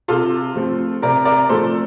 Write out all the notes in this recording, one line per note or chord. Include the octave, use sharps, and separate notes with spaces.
C3 F4 A4
F3 A3 C4
C3 A#4 D5
A#4 D5
F3 A3 C4 A4 C5